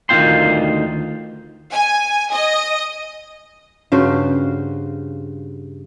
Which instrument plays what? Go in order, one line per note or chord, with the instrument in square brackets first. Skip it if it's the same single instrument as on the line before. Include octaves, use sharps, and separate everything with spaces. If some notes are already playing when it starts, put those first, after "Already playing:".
[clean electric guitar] D2 D#3 D#4 F4 G5 C6
[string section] G#5
D#5
[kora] G2 C#3 F#4 C5